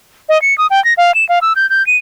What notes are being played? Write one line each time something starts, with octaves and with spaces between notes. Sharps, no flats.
D#5
C#7
D#6
G5
A#6
F5
E7
F5
E6
G6
G6
D#7